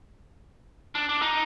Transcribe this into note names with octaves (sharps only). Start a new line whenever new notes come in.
D4
D4
D#4